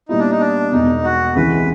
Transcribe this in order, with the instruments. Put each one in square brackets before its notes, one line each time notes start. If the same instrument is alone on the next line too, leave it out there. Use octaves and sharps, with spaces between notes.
[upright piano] A#2 G3 B3 E4 [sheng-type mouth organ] D#4
[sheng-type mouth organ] D4
D#4
D4
[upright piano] E1 E2 B2 [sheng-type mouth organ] D#4
[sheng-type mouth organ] F#4
[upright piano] C#2 C3 E3 G#3 [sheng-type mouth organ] B4